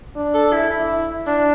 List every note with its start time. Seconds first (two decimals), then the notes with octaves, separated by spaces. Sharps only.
0.16 D4
0.34 A4
0.52 E4
0.71 E4
1.27 D4